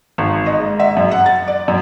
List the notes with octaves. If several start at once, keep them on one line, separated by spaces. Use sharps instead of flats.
G#1
D#5
G#2
E5
F#2
F#5
A6
D5
F#2